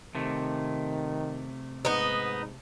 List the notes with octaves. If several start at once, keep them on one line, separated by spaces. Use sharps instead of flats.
C3 D#3 A3
G#2 B3 D#4